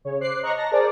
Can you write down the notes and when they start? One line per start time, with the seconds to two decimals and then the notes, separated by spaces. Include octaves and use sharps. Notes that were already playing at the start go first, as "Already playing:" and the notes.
0.05 C#3 C#5
0.21 C5 D6 F#6 C7
0.43 D#5 A#5 C#6 F#6 A#6
0.56 A5 A#5 A#6
0.71 G#4 A#4 C5 D5